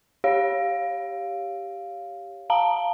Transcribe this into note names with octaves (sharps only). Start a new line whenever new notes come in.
G4 C#5 F5
F5 A5 A#5